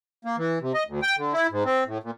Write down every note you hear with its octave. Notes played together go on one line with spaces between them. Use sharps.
A#3
E3
C3
D#5
D2
G5
D3
E4
G#2
C4
A2
A#2